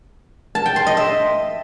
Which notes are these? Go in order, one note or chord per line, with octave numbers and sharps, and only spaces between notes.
A5
G5
C6
D#5
E5